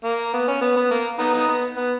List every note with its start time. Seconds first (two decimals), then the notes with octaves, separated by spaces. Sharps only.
0.05 A#3
0.34 B3
0.48 C#4
0.61 B3
0.76 B3
0.91 A#3
1.19 B3 D#4
1.33 B3 D#4
1.48 B3
1.76 B3